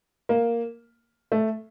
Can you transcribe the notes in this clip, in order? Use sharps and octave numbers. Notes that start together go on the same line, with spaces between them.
A#3
A3